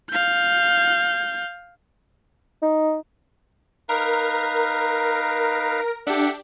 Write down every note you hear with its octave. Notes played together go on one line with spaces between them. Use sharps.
F5 G6
D#4
D#4 A#4 B4 F5
D4 G4 A4 E5 F#5